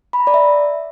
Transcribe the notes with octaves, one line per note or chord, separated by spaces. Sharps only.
B5
A#5
D5
E5